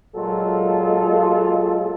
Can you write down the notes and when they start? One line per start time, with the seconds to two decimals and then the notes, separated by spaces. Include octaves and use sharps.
0.15 A#2 F#3 G#3 F4 G#4 A4